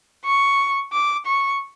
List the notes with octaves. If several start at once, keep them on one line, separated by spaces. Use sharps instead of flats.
C#6
D6
C#6